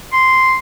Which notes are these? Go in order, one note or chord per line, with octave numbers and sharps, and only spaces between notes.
C6